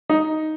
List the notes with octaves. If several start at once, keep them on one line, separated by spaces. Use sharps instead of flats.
D#4